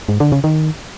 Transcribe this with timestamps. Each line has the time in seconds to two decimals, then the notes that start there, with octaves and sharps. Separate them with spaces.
0.09 G#2
0.20 D3
0.32 C#3
0.44 D#3